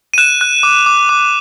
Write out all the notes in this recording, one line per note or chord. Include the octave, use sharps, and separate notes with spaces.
D#7
F#6 E7
F#6
D6
D6
D6